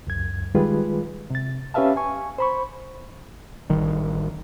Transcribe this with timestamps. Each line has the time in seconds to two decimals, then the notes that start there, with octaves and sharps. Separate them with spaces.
0.07 C#2 F#2 G#6
0.55 D#3 G3 G#3 F4 G#4 B4
1.30 C3 A6
1.74 C#4 G4 B4 E5 F5 A5
1.97 G#5 C#6
2.38 C5 B5 C#6
3.70 A1 D#3 G3